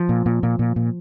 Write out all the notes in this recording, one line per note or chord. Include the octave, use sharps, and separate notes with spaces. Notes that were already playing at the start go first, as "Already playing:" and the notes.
Already playing: F3
A#2
A#2
A#2
A#2
A#2